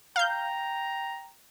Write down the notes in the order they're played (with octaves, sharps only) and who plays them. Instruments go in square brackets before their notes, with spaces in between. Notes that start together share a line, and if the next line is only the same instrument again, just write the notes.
[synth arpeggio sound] F5 G6 [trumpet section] G5 A#5